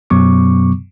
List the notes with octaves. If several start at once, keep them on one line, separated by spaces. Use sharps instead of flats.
F#2 B2 F#3 B3 C#6 D6